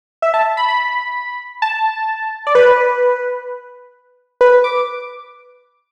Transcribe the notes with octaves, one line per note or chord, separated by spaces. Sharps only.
E5
A5
B5
B5
A5
D5
B4
B4
D6